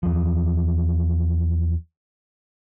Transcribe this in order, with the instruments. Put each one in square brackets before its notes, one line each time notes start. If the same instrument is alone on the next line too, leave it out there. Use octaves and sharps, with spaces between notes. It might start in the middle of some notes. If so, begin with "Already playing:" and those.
[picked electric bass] E2 F3